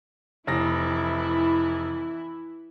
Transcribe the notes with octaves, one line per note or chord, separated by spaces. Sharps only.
F1 E3 E4 A#6